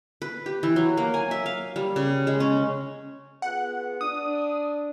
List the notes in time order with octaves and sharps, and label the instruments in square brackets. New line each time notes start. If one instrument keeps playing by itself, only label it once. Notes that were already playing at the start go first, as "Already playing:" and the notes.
[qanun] B4
G4
E3
F#3
A#3
G#5
E5
F5
G3
C#3
G#3
C#4
[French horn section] B3 F4 G#4 [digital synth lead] F#5
[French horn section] D4 [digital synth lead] D#6